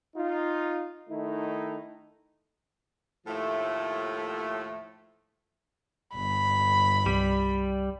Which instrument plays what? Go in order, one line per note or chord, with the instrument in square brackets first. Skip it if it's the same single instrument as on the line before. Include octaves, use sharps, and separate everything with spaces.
[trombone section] D#4 F4
D#3 A3 D#4 E4
[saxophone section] D#2 A2 F3 A3
[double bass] G1 [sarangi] B5
[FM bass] C2 [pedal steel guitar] G3